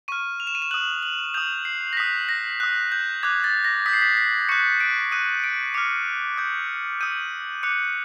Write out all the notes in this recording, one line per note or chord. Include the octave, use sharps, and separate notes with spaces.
C#6 F6 D#7
F7
E7
D#7
E7
D#6 F#6 F#7
F#7
D#6 G6 F7
C7
A#6
D#6 F#6 B6
A#6
D#6 F#6
G6
D6 F#6 G#6
A6
A#6
D#6 G6 B6
C7
B6
B6
C#6 F#6 C#7
D7
D#6 F#6 D#7
D7
D6 F6 C#7
D#6 G6
D#6 G6 D#7
D6 F#6 C#7